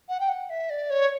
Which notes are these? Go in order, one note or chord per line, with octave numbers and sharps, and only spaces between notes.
F#5
G5
F#5
E5
D5
C#5